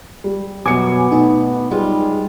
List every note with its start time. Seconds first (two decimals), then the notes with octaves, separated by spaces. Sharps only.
0.24 G3
0.66 F#2 B2 F#3 B3 G#5 D6 C#7
1.12 B2 A3 D#4
1.71 F#2 G3 G#3 F4 G#4